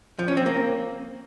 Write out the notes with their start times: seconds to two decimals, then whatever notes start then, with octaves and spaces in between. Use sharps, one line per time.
0.19 F3
0.28 C#4
0.37 C4
0.46 A#3